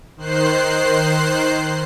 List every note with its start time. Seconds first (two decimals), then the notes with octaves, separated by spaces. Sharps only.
0.17 D#3 C5 F#6 C7